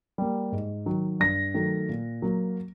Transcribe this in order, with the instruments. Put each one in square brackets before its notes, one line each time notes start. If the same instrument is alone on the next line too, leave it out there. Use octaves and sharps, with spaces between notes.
[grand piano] G3 A#3
G#2
D#3 F#3
G2 A#6
D#3 F#3 A3
A#2
F#3 A#3